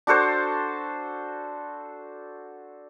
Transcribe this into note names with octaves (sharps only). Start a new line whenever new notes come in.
D4 F#4 A4 C5